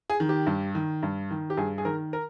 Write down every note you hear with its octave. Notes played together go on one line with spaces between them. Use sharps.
G#4
D#3
G4
G2
D#3
G2
D#3
G4
G2 G#4
G#4
D#3 A#4
A#4